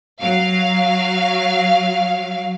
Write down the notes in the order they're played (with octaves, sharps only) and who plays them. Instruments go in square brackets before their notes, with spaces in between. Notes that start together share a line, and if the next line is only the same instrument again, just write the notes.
[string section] F#3 F5